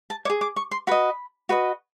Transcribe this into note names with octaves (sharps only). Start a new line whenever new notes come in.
A5
C#5 D6
G#4
D6
C#6
C6
F#4 B4 D#5 B5
F#4 B4 D#5